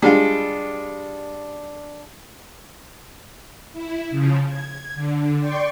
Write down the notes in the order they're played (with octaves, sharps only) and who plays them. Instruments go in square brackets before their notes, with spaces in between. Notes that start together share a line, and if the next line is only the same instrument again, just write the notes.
[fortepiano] G3 G#3 F4 [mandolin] D4
[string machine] E4
C#3 F3
G#6
D3
D5 G5 C6 C#6